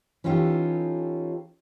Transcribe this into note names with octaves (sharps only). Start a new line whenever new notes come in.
E3 C#4 D#4 F4 G4 A4